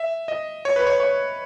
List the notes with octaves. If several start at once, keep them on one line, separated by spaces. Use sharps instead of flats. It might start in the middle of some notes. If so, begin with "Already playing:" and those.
Already playing: E5
D#5
C#5
B4
C#5
C#5